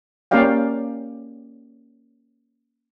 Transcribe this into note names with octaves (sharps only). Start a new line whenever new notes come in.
A#3 C#4 G4 D5 F5 G5